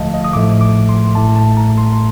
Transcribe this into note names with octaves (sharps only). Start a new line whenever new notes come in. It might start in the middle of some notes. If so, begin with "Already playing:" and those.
Already playing: D#2 D3 F3 A3 D#5 F5 A5
D#5
D#6
A1 A2 F3 A3 D6
D6
C6
A1 A2 A3 A5
A5
A#5
C6